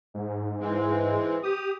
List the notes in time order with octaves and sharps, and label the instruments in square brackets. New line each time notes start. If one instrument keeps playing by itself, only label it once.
[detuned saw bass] G#2
[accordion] E3 G#3 C4
G4 D#6